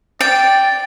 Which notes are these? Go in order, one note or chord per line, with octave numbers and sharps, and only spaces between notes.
D5 G5